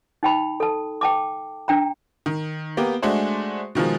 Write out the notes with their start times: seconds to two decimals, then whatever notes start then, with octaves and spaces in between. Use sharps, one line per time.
0.23 D#4 G5 B5
0.60 A4 A5
1.01 G5 A5 D6
1.68 D4 G5 A#5
2.26 D#3
2.77 A#3 B3 G4
3.02 G#3 A3 D4 F#4 C5
3.75 B2 D#3 F3 G#3